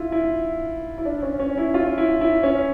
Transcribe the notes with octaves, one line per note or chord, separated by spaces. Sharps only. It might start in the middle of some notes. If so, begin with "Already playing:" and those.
Already playing: E4 F4
E4
E4
D4
C#4
C#4
E4
F4
E4
E4
C#4